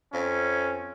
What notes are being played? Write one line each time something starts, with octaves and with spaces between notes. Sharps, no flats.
F2 C#4